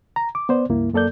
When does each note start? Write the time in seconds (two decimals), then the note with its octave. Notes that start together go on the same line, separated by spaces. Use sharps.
0.16 A#5
0.35 D6
0.49 B3 C5 D5
0.69 C#2 G2 A#3 E4
0.93 F#2 A#3 A4 D5 G6